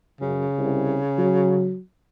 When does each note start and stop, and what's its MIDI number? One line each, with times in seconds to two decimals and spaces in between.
0.21 0.47 42
0.21 1.74 49
0.59 0.98 36
1.18 1.80 54